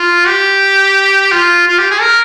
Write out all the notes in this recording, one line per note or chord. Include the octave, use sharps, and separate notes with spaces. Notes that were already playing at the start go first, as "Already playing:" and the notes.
Already playing: F4
G4
F4
F4
G4
G#4
A#4